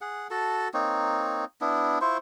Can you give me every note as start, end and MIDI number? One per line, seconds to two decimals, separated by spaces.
0.01 0.28 68
0.01 0.28 78
0.31 0.68 66
0.31 0.68 69
0.31 0.68 81
0.74 1.45 58
0.74 1.45 60
0.74 1.45 63
0.74 1.45 73
1.61 1.99 59
1.61 1.99 62
1.61 1.99 64
2.01 2.18 64
2.01 2.18 65
2.01 2.18 72
2.01 2.18 85